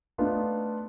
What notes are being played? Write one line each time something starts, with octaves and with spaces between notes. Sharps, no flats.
A3 B3 D4 D#4 F4